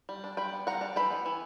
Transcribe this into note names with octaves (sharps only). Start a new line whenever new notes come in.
G3
D4
G3 G5 B5
B3
G3 F#5 A#5
D4
E3 G5 B5
B3
E3